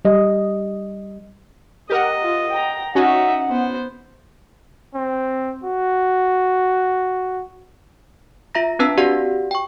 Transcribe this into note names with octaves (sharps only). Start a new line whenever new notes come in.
G3 D#5
G4 A#4 D#5 F#5
F4
G5 A#5
C#4 D#4 F#4 E5 F#5
B3 C5
C4
F#4
F4 E5 A#5 A#6
C4 D4 B4 A5 E6 B6
F#4 G4 D5 F5 F#5
G5 C#6